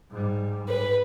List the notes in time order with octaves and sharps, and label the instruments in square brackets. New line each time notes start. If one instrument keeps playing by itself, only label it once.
[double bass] G#2 G3
[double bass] G#2 [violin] B4